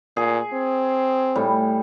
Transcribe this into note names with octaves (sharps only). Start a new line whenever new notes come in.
A#2 G#4
C4
A2 G3